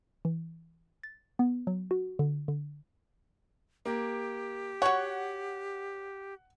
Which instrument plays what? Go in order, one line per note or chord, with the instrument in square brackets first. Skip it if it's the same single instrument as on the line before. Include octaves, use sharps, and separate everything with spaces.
[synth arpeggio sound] E3
A6
B3
F#3
F#4
D3
D3
[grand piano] A#3 [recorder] G4
[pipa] F#4 C#5 [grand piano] F#5